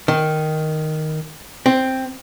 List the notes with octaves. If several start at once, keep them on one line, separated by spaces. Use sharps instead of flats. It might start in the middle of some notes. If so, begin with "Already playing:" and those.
D#3
C4